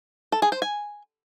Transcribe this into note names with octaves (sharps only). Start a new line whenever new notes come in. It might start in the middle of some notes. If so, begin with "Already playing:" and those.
A4
G#4
C5
G#5